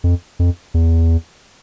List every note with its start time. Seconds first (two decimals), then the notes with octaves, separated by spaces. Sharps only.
0.04 F2
0.39 F2
0.74 E2